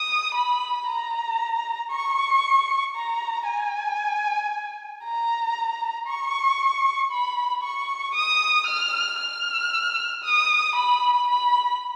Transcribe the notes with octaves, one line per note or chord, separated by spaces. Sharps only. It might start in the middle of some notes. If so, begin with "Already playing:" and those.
Already playing: D#6
B5
A#5
C#6
A#5
G#5
A#5
C#6
B5
C#6
D#6
F6
F6
D#6
B5
B5